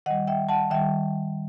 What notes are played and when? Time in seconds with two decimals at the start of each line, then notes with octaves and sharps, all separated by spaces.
0.06 D#3 D#5 F#5
0.11 G3
0.27 E5 G5
0.49 F#5 A5
0.70 D#3 G3 E5 G5